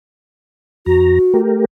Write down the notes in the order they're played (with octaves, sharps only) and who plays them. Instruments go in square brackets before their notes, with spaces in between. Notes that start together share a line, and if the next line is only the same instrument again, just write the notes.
[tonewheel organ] F2 A#5 [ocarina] F#4
[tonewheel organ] A3 G4 A#4